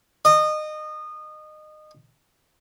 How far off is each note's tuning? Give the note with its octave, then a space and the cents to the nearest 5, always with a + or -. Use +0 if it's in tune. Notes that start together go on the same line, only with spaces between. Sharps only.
D#5 -25